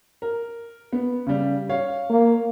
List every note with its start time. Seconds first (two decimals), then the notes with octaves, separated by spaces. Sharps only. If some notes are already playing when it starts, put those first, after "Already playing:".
0.22 A#4
0.93 B3
1.27 C#3 G3
1.69 C#5 F5
2.10 A#3